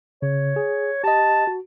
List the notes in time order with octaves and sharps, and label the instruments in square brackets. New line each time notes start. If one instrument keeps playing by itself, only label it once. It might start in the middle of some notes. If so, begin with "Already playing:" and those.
[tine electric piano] C#3 [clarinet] C#5
[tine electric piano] G#4
[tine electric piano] G4 D#5 [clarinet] A5
[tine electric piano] F#4